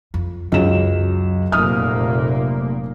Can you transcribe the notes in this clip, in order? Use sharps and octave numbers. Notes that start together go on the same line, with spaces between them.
F2
C#2 F#2 F#3 E7
F1 A#2 F#3 A#3 D#6 F6